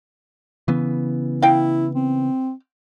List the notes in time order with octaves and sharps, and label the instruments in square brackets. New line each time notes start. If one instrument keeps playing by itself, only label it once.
[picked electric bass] C#3 E3 B3
[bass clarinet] E4 [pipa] F5 G5
[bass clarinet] C4